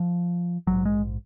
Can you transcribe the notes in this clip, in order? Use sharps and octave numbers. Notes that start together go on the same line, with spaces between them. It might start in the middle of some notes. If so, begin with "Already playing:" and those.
Already playing: F3
A#1 G#2 F#3
G#3